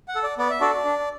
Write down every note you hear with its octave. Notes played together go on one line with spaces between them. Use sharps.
F#5
A4
D5
B3 D5
E5
D4 F#4 A4 D5
D4